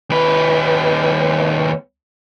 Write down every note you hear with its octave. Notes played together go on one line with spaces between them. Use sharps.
D#2 B4